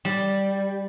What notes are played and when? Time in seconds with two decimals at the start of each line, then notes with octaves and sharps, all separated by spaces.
0.05 G3